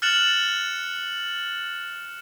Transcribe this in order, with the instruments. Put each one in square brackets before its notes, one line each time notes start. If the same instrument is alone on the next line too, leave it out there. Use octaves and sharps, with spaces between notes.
[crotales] F6 F#6 A6 C#7 E7 F#7